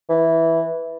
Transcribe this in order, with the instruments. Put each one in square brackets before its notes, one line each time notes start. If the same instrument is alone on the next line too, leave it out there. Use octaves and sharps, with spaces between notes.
[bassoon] E3